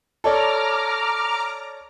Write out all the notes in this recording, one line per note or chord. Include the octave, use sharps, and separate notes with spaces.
A4 C#5 D5 A#5 D6 F6